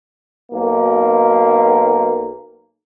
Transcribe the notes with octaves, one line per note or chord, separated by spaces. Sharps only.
B1 A#3